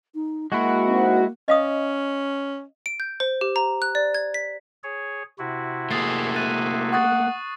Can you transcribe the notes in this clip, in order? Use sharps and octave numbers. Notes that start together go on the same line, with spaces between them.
D#4
G#3 A#3 E4 F#4
C4 D#4 F#5
C#4 D#5 F5 D#6
D7
G6
C5
G4
A#5
F#6
D5
G#6
B6
G#4 C#5
C3 E4 F#4
A3 A#3 G#4 D#6 A6 C7
F#6 A6 D#7
F#5 C#6 D#6 A6